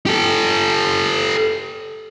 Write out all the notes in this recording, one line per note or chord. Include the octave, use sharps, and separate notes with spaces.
G4 A4